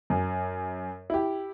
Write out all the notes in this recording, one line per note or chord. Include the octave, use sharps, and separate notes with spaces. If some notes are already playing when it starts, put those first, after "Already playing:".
F#2
E4 G4